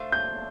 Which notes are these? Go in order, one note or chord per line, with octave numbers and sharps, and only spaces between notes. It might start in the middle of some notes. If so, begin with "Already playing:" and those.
Already playing: A3 D4 F4 C5
G6